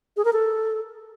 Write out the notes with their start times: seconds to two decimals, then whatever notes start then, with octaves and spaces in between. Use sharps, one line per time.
0.17 G#4
0.25 A#4
0.33 A4